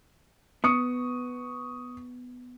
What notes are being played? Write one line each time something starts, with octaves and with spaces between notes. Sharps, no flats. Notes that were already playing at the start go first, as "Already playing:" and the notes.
B3 C#6 D#6 C#7